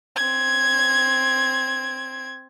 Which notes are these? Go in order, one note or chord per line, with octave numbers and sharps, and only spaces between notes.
C4 G#6